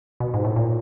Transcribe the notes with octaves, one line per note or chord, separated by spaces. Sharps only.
B2
G#2
A2
A#2